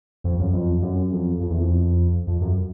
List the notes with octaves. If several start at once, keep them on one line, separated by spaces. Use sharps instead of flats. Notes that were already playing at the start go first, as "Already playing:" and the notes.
F2
F#2
F2
F#2
F2
F2
E2
F2
F2
F#2